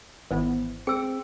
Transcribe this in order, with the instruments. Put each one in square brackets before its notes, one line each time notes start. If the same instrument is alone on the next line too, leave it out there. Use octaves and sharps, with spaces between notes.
[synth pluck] G#1 E3 B3 [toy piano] C5
[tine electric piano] C4 [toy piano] G#4 E6 [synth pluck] C#7 D7